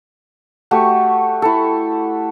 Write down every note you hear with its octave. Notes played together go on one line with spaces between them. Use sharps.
A3 F#4 G4
E4 A4